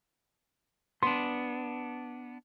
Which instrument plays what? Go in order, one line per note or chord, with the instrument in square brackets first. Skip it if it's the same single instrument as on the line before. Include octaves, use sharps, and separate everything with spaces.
[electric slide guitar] B3 D4 [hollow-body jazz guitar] C6